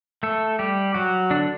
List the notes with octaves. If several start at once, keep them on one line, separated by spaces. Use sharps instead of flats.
A3 A4
G3 G4
F#3 F#4
D3 D4